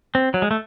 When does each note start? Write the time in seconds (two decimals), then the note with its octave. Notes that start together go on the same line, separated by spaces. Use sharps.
0.15 C4
0.34 F#3
0.42 G#3
0.51 A3